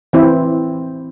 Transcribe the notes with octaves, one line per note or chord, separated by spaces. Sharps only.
E3 C4 E4